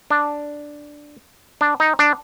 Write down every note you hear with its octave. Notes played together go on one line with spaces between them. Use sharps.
D4
D4
D#4
D4